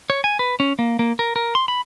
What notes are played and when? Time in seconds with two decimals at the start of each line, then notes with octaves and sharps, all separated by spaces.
0.10 C#5
0.24 G#5
0.39 B4
0.60 C#4
0.79 A#3
0.99 A#3
1.19 A#4
1.36 A#4
1.55 C6
1.68 B5